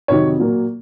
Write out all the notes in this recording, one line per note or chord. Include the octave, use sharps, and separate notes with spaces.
F2 C3 D#3 F#3 C#5
A#2 F#3 A#3